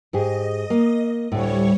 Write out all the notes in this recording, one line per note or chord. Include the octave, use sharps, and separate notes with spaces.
G#2 G4 G#4 D#5
A#3
D2 A2 G3 C#5